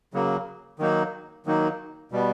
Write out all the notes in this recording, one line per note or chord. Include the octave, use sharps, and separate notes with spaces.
C#3 F#3 A#3
D#3 F#3 A#3 D#4
D#3 F#3 A#3 D#4
B2 G3 B3